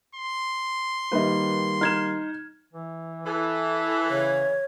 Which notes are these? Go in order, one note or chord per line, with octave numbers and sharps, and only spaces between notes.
C6
D#3 G3 A#3 B4 D#5
D#4 F6 G#6 E7
E3
E3 A4
C#3 C#5